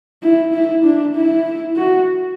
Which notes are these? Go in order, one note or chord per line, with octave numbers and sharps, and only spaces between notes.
E4
E4
D4
E4
F#4